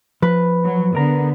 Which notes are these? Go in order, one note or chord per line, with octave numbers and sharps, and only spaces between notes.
F3 B4
F#3
D3 B3 A#4 A#5